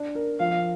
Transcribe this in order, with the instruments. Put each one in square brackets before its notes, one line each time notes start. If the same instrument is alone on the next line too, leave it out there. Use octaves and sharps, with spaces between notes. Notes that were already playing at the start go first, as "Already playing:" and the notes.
Already playing: [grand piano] D4
A#4
[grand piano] F3 [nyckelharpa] F5